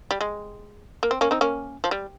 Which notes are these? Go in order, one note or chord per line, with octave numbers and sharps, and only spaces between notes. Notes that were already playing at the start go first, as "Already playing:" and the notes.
G3
G#3
A#3
C4
A#3 C#4
C4 D#4
A#3 C#4
F3
G3